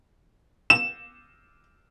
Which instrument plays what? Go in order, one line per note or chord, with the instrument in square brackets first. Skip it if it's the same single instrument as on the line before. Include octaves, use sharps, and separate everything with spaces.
[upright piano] E7